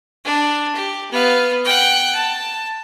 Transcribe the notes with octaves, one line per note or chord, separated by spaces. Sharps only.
D4
G4
B3 F5
F#5 G5
A5